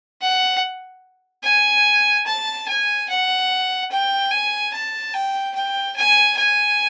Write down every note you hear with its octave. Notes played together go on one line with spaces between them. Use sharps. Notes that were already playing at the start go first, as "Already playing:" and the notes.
F#5
G#5
A5
G#5
F#5
G5
G#5
A5
G5
G5
G#5
G#5